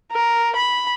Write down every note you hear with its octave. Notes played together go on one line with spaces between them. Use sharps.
A#4
B5